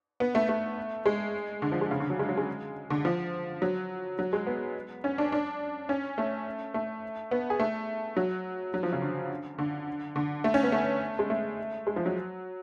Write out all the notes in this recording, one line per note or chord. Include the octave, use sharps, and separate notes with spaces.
B3
A3
A3
G#3
D3
F3
G#3
C#3
D3
F#3
G#3
F#3
G#3
D3
F3
F#3
F#3
G#3
B3
C#4
D4
D4
C#4
A3
A3
B3
G#4
A3
F#3
F#3
F3
C#3
D3
D3
D3
A3
C#4
B3
A3
G#3
A3
G#3
F3
F#3